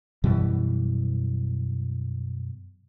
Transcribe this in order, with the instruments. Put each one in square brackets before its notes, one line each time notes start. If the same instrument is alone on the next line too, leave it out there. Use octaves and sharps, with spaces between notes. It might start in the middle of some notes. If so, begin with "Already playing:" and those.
[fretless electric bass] F#2 B2 E3 G3